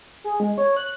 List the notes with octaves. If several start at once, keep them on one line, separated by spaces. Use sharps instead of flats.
G#4
G#3
C#5
F#6